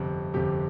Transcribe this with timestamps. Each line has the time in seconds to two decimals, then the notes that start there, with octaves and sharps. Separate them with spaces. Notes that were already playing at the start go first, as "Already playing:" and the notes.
Already playing: G1 F2 C3
0.34 G1 F2 C3 G4